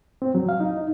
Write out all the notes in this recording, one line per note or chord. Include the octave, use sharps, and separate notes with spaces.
C4
F#3
F5
D#4
D#4